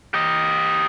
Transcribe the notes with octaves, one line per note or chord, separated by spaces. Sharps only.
G4 D#5